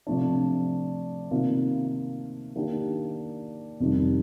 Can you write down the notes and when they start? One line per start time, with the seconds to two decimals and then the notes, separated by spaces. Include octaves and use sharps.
0.07 C3 F3 A3 D4
1.31 C3 D#3 A#3 F4
2.56 D#3 A#3 D4 G4
3.80 F2 C3 D#3 G3